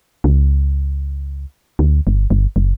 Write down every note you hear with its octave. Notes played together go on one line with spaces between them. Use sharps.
C#2
D2
G1
G1
F#1